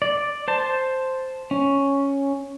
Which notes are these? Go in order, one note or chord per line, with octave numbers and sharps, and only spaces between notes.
D5
C5 A5
C#4